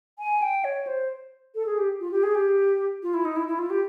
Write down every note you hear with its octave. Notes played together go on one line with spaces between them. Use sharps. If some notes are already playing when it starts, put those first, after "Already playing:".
G#5
G5
C#5
C5
A4
G#4
G4
F4
G4
G#4
G4
F4
E4
D#4
E4
E4
F4
G4